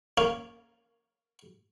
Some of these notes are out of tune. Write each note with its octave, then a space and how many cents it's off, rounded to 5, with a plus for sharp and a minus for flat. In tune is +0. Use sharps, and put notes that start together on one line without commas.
A#3 +0 C#4 +0